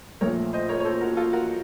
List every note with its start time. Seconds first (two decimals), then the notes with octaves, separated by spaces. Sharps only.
0.21 A#1 A#2 F3 A3 A#4 C#5
0.53 C5 D#5
0.69 A#4 C#5
0.80 C#5
0.85 A4 C5
1.01 F#4 A#4
1.17 F4 A4
1.33 F#4 A#4